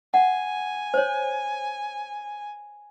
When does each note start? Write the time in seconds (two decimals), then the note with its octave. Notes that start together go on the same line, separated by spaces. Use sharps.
0.14 F#5 G#5
0.94 C5 C#5